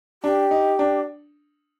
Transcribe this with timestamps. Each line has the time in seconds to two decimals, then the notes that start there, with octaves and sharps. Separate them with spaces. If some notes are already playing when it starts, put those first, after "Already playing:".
0.23 D4 G4
0.51 D#4
0.79 D4